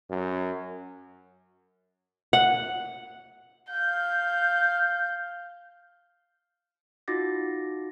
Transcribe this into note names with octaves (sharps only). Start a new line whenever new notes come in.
F#2
F#5
F5 G6
D#4 F4 F#4 D6 A6 A#6